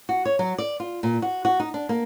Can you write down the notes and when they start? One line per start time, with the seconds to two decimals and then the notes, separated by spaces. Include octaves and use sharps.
0.09 F#4
0.25 C#5
0.39 F#3
0.58 D5
0.80 F4
1.03 A#2
1.22 F#4
1.45 F#4
1.60 D#4
1.74 D4
1.89 A#3